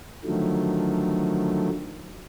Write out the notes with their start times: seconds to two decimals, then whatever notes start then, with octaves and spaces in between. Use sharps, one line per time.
0.25 D3 D#3 F3 F#3 A3